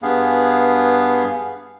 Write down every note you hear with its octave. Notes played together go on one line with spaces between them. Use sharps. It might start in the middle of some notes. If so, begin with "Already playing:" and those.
G2 B3 G#4 F5